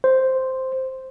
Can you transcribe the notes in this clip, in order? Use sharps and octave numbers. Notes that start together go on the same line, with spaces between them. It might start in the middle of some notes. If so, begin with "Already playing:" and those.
C5